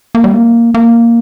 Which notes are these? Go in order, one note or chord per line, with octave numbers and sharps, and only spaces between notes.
A#3
G3
A#3
A#3